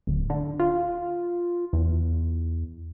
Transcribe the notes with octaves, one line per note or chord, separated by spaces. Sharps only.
D1
D3
F4
E2